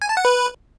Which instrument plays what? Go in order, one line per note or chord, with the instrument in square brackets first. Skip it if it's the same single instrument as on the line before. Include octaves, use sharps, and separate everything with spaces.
[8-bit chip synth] G#5
A5
F#5
B4